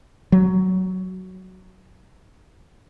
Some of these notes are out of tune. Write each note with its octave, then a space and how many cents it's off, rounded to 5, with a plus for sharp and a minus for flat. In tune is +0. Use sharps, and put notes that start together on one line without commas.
F#3 +10